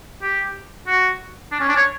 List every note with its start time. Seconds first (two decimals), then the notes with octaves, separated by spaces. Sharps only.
0.22 G4
0.87 F#4
1.52 D4
1.60 C#4
1.68 D4
1.76 C#5